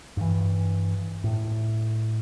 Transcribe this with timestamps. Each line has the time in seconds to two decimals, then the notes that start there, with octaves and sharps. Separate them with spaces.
0.17 G2 E3
1.24 A2